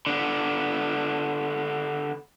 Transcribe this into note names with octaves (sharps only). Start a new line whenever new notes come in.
D3 B3